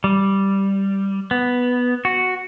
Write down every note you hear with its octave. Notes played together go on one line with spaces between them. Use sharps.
G3
B3
F#4